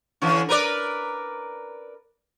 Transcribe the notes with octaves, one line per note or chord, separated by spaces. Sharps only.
D3 E3 C#4
A#4 B4 D5